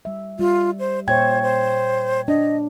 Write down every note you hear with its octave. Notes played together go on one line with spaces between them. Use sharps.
G3 E5
G3 F4
C5
A#2 C5 C#5 E5 G5 G#6
C5
D4 D#5